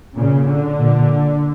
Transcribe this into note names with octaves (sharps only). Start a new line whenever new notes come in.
A#2 C#3
D3
A#2